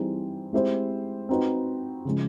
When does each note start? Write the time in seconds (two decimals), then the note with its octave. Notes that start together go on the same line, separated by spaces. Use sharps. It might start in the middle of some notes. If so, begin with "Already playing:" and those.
Already playing: E3 G3 C4 D#4 G#4
0.53 G#3 C4 E4 G4 C5
1.29 C4 D#4 F#4 B4
2.05 C#3 F3 G#3